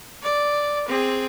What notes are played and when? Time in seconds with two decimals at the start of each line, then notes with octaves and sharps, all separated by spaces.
0.23 D5
0.88 C4 G#4